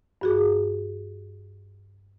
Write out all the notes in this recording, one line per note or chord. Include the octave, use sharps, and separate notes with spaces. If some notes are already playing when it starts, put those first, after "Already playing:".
G2 F#4 G#4